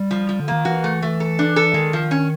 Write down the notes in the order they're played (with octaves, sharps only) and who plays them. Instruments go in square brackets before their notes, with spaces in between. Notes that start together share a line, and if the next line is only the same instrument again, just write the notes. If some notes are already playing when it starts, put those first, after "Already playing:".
Already playing: [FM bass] G3
[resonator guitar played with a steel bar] F3
F3
[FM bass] D3
[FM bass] D#3 [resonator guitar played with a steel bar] A#3
[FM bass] E3 [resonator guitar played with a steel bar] F#4
[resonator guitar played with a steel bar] A3
A3
A4
D4
A4
[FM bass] D#3 [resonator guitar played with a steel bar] G#3
[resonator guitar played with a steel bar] F3
C#4